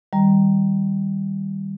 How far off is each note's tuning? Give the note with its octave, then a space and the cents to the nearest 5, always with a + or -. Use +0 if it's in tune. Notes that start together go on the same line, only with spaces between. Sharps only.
D#3 +0 G3 +0 A#5 +0